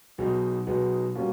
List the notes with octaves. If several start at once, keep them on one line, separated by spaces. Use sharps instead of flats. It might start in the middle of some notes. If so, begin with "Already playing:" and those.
B1 B2 G#3 B3 D#4
B1 B2 G#3 B3 D#4
B2 G3 A#3 C#4 F4